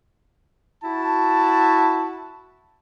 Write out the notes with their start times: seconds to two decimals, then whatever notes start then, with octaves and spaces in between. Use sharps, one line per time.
0.84 E4 F#4 A5